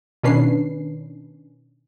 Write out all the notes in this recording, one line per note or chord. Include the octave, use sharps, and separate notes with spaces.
B2 D#3 C#4 D4 B4 C7